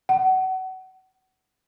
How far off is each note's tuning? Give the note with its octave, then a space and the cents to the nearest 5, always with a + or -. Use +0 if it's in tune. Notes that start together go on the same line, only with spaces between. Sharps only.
F#5 +25